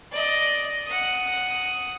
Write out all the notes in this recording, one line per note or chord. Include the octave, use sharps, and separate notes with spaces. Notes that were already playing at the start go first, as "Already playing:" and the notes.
D5 D#5
F#5 D#6